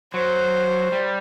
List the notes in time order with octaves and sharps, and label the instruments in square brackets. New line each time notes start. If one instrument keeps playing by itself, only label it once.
[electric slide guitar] F#3 [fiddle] C5
[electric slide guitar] G3